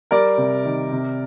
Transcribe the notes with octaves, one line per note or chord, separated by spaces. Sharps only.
G3 A#4 D5
C3
D#3
C3